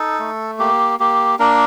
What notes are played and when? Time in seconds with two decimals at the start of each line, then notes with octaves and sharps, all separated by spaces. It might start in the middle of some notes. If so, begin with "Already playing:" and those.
Already playing: D#4 A4
0.19 A3
0.59 A#3 G4
1.00 A#3 G4
1.39 A#3 D4 A#4